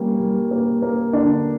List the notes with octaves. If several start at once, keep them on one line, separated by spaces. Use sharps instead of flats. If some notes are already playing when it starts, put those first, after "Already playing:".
Already playing: G3 A#3 C#4
G3
A#3
A#3
D3 D4 D5